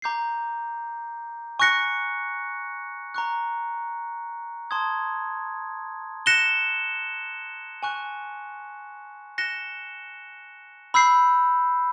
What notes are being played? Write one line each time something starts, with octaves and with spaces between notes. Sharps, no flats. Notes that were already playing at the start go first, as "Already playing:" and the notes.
A#5 D6 G6 C7
G#5 C#6 F#6 A#6 C#7
A#5 C#6 F#6
A5 C6 D#6 G#6
F#6 A#6 C#7 E7 G7
G#5 C#6 F#6
F#6 A#6 C#7 E7 G7
B5 E6 G6 C7